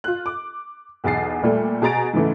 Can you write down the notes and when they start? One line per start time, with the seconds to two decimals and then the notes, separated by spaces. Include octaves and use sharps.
0.04 F4 F#6
0.26 D6
1.04 B1 E2 G#4 A6 C7
1.43 A#2 G3 A3
1.82 B2 G#4 G#5 A#5 A6 D7
2.13 G#2 C#3 E3 A3